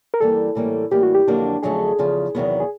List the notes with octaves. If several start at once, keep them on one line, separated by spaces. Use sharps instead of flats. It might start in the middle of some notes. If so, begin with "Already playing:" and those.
A#4
G2 E3 G3 A#3 A4
A2 E3 G3 A#3 C#4
A2 E3 G3 A#3 G4
F#4
G4
F2 D3 F#3 A#3 D4
F2 D3 F#3 A3 C#4 G#4
E2 C#3 F3
E2 C3 D#3 F#3 B3
G#4